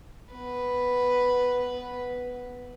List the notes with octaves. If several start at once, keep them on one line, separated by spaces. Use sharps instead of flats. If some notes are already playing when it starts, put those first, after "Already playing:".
B3 B4